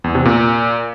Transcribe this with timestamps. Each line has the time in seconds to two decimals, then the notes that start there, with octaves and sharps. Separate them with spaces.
0.04 E2
0.15 C3
0.25 A#2